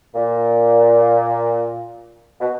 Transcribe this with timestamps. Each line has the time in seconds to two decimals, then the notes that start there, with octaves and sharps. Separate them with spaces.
0.15 A#2
2.41 B2